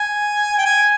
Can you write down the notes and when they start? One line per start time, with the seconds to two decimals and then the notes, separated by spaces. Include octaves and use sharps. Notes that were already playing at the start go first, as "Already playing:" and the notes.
Already playing: G#5
0.58 G5
0.66 G#5